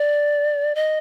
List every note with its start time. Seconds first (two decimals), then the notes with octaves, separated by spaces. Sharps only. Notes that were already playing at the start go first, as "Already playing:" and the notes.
Already playing: D5
0.75 D#5